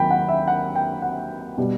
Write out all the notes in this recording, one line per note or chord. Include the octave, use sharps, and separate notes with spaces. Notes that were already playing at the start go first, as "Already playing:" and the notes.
Already playing: D#2 D#3 F#3 G5 B5
F#5
E5
F#5
G5
F#5
B2 G3